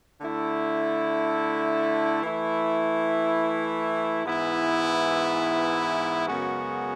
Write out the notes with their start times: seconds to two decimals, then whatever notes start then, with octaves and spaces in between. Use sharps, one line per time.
0.20 D3 A3 E4
2.22 E3 A3 E4
4.24 G#2 E3 B3 E4
6.27 F#2 C#3 G#3 B3 F#4